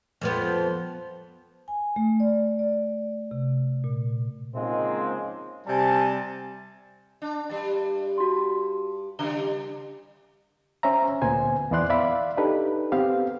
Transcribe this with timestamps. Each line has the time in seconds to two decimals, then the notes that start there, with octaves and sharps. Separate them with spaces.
0.21 F2 F3 B3
1.68 G#5
1.96 A3
2.20 D5
2.59 D5
3.31 C3
3.84 A#2
4.55 G#2 C#3 F3 G#3 A#3 C4
5.66 C3 G3 G#5 A5
7.22 D4
7.50 G2 G3
8.18 F#4 C6
9.19 C#3 G3 G7
10.83 C#4 C5 E5 A#5
11.22 D2 A#2 B3 C5 G#5
11.71 E2 B3 E4 D5 C6 F#6
11.90 D5 E5 F5 B5
12.37 D4 D#4 G4 A4 B4
12.92 B3 C4 G4 F5